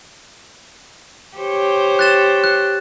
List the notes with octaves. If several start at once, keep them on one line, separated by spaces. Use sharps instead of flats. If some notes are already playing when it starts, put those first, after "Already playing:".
G4 C5 C#5
F#6 A6 E7
F#6